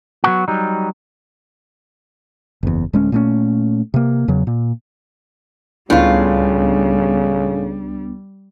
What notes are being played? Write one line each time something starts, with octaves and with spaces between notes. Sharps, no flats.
F#3 B3 F#4
F#3 G3 D#4
F#1 E2
D1 G#3 C#4
A#2 A3 C#4
C3 A#3
E2 C#3 F#3
A#2
C#2 A2 C#3 G3 B3 D4 F4